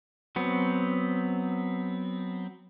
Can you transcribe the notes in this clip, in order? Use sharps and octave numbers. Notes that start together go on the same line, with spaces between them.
F#3 B3 C4